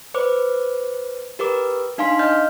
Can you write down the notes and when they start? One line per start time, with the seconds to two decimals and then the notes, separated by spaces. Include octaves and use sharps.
0.14 B4 C5 D6
1.39 G4 A#4 B4 D6
1.98 D4 D#4 F5 G#5 C6 B6
2.19 D#5 F6 G6